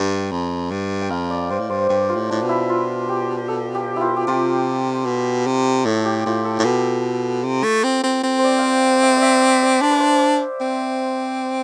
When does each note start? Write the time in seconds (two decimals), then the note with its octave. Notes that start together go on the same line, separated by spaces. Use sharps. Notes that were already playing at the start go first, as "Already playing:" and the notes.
Already playing: G2 G5
0.32 F2
0.71 G2
1.02 G5
1.10 F2 F5
1.30 D5
1.50 G2 C5
1.60 A2
1.70 G2 C5
1.90 G2 G4
2.09 F4
2.16 A2
2.29 A2 D4
2.43 B2
2.49 E4
2.69 F4
3.09 G4
3.48 A4
3.75 G4
3.96 E4 F4
4.16 G4
4.27 C3 F4
5.06 B2
5.47 C3
5.86 A2 A4
6.05 G4
6.19 G4
6.26 A2 F4
6.45 A4
6.59 A2
6.65 B2 A4
7.44 C3
7.64 A3
7.84 C4
8.04 C4
8.24 C4
8.39 C5
8.44 D5
8.58 F5 G5
9.03 E5
9.17 D5
9.22 E5
9.42 D5
9.63 D5
9.82 D4 C5
9.91 B4
10.00 C5
10.61 C4